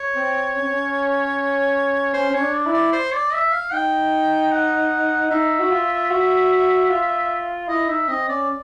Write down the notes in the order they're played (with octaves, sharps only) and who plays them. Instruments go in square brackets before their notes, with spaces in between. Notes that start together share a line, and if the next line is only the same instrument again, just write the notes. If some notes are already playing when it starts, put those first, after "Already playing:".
Already playing: [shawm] C#5
[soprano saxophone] C4
C#4
C4
C#4
[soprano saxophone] C#4 [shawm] C5
[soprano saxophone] C#4 [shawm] C#5
[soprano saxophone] D4
[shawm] D5
[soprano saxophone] E4
[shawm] D5
C5
D5
E5
F5
[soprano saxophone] D#4 [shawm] G5
[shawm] F#5
[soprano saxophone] D#4 [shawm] E5
[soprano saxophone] F#4
F4
F#4
F4
[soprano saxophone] E4 [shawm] D#5
[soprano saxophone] D#4 [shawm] E5
[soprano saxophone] C4 [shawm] D#5
[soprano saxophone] C#4 [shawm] D5